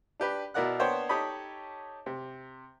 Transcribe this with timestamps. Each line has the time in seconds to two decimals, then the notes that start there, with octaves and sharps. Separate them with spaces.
0.20 D4 G4 B4
0.54 B2 E4 A#4 D5 F#5 F#6
0.80 A#3 B3 D4 C5 C#5 G5
1.09 D#4 G4 A4 C#5 D#5 B5
2.06 C3